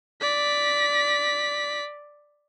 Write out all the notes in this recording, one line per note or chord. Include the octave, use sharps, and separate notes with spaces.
D5 B6